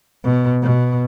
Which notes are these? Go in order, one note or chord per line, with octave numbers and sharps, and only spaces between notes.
B2
B2